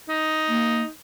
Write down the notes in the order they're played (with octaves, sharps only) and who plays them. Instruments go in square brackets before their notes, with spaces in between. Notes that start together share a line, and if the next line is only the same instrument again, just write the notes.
[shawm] D#4
[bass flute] A#3